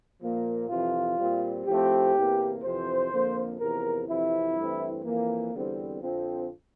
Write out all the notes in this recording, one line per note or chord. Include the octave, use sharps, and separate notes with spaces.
A#2 F3 A#3
F2 C3 E3 F4
A#2 G3 C4
A2 F3 A3 C4 G4
E2 C3 E3 A#3
F2 C3 E3 C5
F2 D3 F3 A#3
E2 C3 F3 A#4
F2 C3 E3 E4
G2 E3 A3 C4
F2 E3 A#3
E2 D3 G3 C4
F2 D3 F3 C4